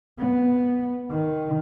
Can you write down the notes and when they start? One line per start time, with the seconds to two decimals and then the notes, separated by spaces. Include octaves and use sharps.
0.19 B3
1.11 D#3